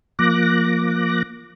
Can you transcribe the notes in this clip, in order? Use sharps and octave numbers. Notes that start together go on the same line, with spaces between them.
F3 A#3 D6 F#6 A#6